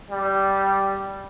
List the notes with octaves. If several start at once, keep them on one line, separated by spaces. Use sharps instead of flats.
G3